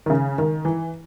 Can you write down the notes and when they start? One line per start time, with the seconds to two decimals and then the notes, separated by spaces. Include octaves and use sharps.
0.06 D#3
0.10 C#3
0.38 D#3
0.65 E3